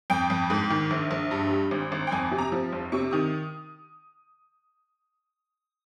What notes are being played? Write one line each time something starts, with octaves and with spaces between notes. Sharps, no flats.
F2 G5
F2
G#2
D#3
A#1
A#1
G2
G3
G#1
G#1
G5
F2 G#5
C3
A#5
F3
F1
C3 C#6
D#3 D#6